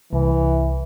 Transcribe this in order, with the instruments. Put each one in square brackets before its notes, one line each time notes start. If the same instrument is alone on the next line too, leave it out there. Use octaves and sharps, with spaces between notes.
[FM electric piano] C2 [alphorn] E3